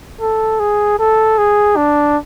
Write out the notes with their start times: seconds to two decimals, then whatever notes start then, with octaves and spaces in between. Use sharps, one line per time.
0.21 A4
0.60 G#4
0.99 A4
1.38 G#4
1.76 D4